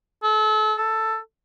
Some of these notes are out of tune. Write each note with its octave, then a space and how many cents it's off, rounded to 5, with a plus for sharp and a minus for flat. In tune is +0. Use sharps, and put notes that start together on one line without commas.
A4 -35
A4 +10